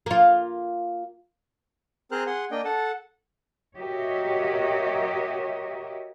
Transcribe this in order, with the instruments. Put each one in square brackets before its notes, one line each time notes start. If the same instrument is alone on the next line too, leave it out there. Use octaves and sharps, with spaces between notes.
[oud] A#3 F4
[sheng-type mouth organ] C4 G#4 A#4 C5 F6 F#6
G#4 F#5 C6
A#3 D4 D#5 G5
A4 F#5 A5
[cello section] F#4 G4 A#4 C#5 D#5 E5